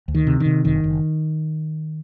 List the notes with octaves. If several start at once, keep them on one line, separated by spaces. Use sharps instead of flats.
D2
D#3
C3
D#3
C3
F#1 D#3
F#1